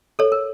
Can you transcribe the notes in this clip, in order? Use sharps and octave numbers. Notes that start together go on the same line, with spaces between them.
A4 C#5
A#4